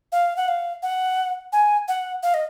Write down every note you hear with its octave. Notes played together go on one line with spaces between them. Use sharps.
F5
F#5
F5
F#5
G#5
F#5
F5
D#5